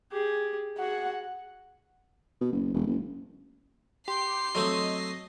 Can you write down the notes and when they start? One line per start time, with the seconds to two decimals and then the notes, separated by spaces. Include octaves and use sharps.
0.12 G4 G#4
0.78 F#4 G#4 F#5
2.41 B2
2.52 F#1
2.74 E1
2.87 F#1
4.08 G4 C6 C7
4.55 F#3 A3 C4 D#5